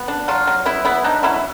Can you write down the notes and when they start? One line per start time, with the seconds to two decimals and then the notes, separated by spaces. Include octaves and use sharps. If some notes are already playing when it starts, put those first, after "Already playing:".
Already playing: B3
0.08 D4
0.28 F#3 F4
0.47 F#3
0.65 B3 E4
0.85 B3 E4
1.04 D4 D#4
1.23 F#3 E4